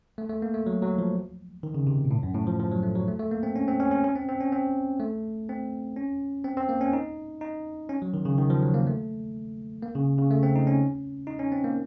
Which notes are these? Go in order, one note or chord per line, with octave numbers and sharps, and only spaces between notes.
A3
A3
A#3
A3
F#3
F#3
F3
D#3
C#3
C3
A#2
A2
F#2
A2
F3
F3
F#3
A3
F#3
A3
A3
A#3
C4
C#4
C4
C#4
C#4
C#4
C4
C4
C#4
C4
A3
C4
C#4
C4
C4
A#3
C#4
D#4
D#4
C#4
F#3
D#3
C#3
D#3
F3
F#3
A#3
A3
A#3
C#3
C#3
A3
C4
D#4
C#4
D#4
C#4
C4
A#3